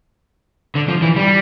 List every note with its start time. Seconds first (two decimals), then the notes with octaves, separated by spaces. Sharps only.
0.75 D3
0.89 F3
1.02 E3
1.16 G3